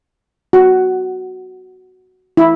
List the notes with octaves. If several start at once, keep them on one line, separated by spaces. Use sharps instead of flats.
F#4
E4